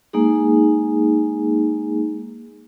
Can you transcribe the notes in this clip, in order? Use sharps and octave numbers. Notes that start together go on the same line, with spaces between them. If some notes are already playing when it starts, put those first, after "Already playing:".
G#3 A#3 D#4 G#4